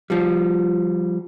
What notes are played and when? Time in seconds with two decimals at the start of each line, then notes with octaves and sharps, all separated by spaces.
0.10 F3 G3